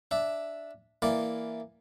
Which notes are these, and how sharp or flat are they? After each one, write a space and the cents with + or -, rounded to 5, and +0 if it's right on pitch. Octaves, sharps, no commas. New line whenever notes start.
D4 +0 E5 +0
E3 +0 A#3 +0 D5 -5